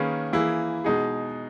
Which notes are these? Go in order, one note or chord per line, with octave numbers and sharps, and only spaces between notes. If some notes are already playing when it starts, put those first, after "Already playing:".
Already playing: D#3 A#3 C#4 G#4 B4
E3 A#3 E4 G#4
B2 G#3 D#4 G#4